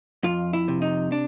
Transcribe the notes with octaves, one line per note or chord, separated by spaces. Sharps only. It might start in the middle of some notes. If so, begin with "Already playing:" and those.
F2 F4
E4
C3
D#4
D4